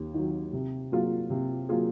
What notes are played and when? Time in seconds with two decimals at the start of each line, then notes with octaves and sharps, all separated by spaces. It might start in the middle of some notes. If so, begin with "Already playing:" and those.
Already playing: D#2
0.14 D#3 F#3
0.53 C3
0.92 F#3 A#3 F4 G#4
1.30 C3
1.69 F#3 A#3 F4 G#4